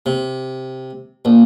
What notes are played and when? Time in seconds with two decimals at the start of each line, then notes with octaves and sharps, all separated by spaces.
0.06 C3
1.25 A#1